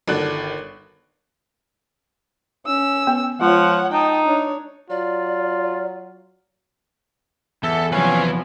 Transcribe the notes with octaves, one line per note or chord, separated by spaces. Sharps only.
G1 D#3 F#4 A4 D5 F#6
C#4 E6
B3
F3 G#3 F4 C#5 F#5
D#4 G5 A5
D4 C#5
F#3 F4 D5
E2 A4 E5
C3 F3 F#3 C#4 B4 F5 G#5